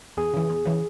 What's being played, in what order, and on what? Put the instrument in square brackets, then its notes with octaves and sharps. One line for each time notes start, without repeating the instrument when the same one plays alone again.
[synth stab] E2 [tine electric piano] G#4
[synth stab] C#3 E3
E2
C#3 E3